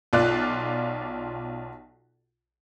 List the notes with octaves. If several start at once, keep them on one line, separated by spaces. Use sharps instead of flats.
B1 F4 D5 F#6